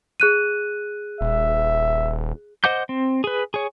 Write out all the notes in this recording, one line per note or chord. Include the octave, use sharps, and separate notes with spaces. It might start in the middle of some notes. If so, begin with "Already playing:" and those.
G#4 F#6 D#7
D#1 E5
C5 D#5 F#5 D6 G6
C4
G#4 B4
G#4 C#5